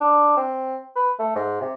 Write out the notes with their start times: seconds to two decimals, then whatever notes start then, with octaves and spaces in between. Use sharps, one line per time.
0.01 D4
0.37 C4
0.96 B4
1.19 A3
1.35 G#2
1.61 C3